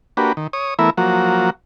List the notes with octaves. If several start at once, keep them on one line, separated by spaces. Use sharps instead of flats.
A#3 D4 F#4 G4 B4
D#3
C#5 D#6
E3 A3 B3 E4 A#4 E5
F3 F#3 A#3 F#4